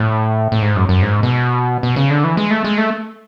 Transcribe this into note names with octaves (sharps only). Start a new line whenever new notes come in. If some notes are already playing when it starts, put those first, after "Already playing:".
Already playing: A2
A2
G#2
F#2
F#2
G#2
B2
B2
C#3
D3
E3
G#3
A3
G#3
A3